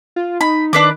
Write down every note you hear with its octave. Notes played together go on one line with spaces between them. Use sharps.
F4
D#4 B5
D#3 D4 B4 D6